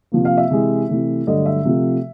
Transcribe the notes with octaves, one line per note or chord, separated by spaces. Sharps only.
C3 F3 A#3
F5
E5
C3 E3 G#3
C3 E3 A3
G2 D3 F#3 A3 D#5
E5
C3 F3 A3